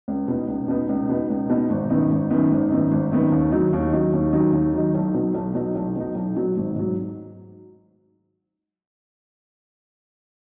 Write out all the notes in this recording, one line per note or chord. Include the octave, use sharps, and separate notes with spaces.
C#2
B2 B3 D#4
C#2
B2 B3 D#4
C#2
B2 B3 D#4
C#2
B2 B3 D#4
G#1
F#2 D#3 B3 D#4
G#1
F#2 D#3 B3 D#4
G#1
F#2 D#3 B3 D#4
G#1
F#2 D#3 B3 D#4
D#2
D#3 F#3 D#4
D#2
D#3 F#3 D#4
D#2
D#3 F#3 D#4
D#2
D#3 F#3 D#4
B1
B2 F#3 D#4
B1
B2 F#3 D#4
B1
B2 F#3 D#4
B1
B2 F#3 D#4
G#1
G#2 F#3